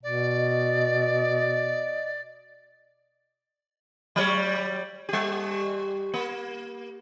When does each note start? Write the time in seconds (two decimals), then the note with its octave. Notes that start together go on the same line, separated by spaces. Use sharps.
0.03 B2 D5
0.37 D#5
4.16 F#3 G3 C#5
5.09 G3 G4
6.14 A#3